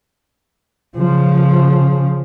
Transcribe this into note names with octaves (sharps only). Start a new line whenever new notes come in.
C#3 F3